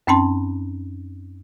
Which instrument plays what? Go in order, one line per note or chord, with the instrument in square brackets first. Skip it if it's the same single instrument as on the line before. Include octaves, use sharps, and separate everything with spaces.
[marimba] F#2 C4 C#4 A5 C6